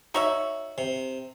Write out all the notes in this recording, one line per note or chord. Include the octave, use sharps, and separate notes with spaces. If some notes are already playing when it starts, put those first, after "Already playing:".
D#4 F#4 C#5 E5
C3